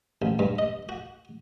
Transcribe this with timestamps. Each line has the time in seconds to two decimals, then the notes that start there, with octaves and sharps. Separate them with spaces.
0.22 A1
0.39 G2
0.59 D#5
0.89 F#4